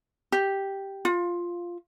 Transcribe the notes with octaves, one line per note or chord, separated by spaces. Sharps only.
G4
F4